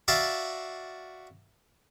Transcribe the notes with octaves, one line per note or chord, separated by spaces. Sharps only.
F#4 D5 E5 F5 A5